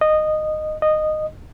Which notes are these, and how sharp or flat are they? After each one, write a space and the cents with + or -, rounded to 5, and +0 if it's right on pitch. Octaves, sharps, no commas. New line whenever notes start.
D#5 -15
D#5 -15